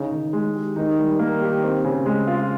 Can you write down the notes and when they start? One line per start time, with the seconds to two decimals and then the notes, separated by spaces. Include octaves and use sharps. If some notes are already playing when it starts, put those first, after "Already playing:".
Already playing: C#3 D#4
0.11 D#3
0.33 G#3
0.55 G4
0.76 D#3 D#4
0.99 G3
1.19 A#3
1.42 G4
1.63 C4
1.84 C#3
2.06 G#3
2.27 F4